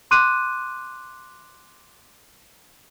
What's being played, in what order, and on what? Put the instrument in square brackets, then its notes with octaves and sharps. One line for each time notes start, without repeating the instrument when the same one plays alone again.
[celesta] C6 D6 F#6 D#7